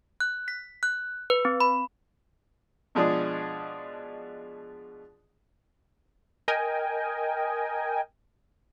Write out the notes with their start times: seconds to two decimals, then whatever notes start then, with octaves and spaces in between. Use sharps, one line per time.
0.20 F#6
0.48 B6
0.83 F#6
1.30 B4
1.45 C4
1.60 B5
2.95 B2 F3 G#3 D4 G#4
6.48 A#4 D#5 G5 G#5